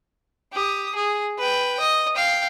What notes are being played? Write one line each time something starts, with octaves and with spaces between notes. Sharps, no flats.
G4 D#6
G#4
B4 G5
D#5
F5 G5